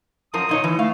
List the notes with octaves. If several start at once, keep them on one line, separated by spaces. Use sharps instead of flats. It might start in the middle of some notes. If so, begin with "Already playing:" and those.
F#2 F3 A#4 D#6
A#2 D#4 C#5
E3
A3 F5